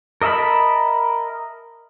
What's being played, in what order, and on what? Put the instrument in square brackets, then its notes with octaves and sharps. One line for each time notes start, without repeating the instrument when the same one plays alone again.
[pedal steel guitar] A#4 D#5 E5 A5 B5